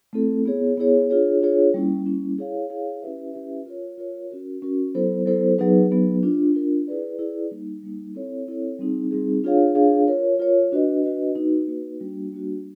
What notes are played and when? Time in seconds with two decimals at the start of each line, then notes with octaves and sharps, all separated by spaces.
0.13 A3 C4 E4 A4
0.45 B3 E4 G#4 C#5
0.77 B3 E4 G#4 C#5
1.10 D4 F4 G#4 C#5
1.41 D4 F4 G#4 C#5
1.74 G3 A#3 C#4 E4
2.06 G3 A#3 C#4 E4
2.38 E4 G#4 C#5 F5
2.70 E4 G#4 C#5 F5
3.02 C#4 E4 G4 B4 E5
3.34 C#4 E4 G4 B4 E5
3.66 F4 A#4 C#5
3.98 F4 A#4 C#5
4.30 C#4 F#4 A#4
4.62 C#4 F#4 A#4
4.95 F#3 B3 E4 A4 C5
5.26 F#3 B3 E4 A4 C5
5.58 F#3 B3 D#4 G#4 B4
5.91 F#3 B3 D#4 G#4 B4
6.23 D4 F4 A#4
6.54 D4 F4 A#4
6.87 E4 G#4 B4 D5
7.19 E4 G#4 B4 D5
7.51 G3 A#3 D#4
7.83 G3 A#3 D#4
8.15 C4 E4 A4 C#5
8.48 C4 E4 A4 C#5
8.79 G3 C4 D#4 G#4
9.11 G3 C4 D#4 G#4
9.44 D4 F4 G#4 C#5 F5
9.75 D4 F4 G#4 C#5 F5
10.08 F4 A#4 C#5
10.39 F4 A#4 C#5
10.72 D4 F#4 B4 D#5
11.04 D4 F#4 B4 D#5
11.35 A#3 D#4 F#4 B4
11.68 A#3 D#4 F#4 B4
12.00 G3 A#3 D4 F#4
12.32 G3 A#3 D4 F#4